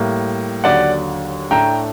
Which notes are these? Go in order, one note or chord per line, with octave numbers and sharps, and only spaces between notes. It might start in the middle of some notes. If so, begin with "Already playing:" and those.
Already playing: A2 G3 A#3
D#2 D3 F#3 D5 F#5
A2 A3 D4 G5 A#5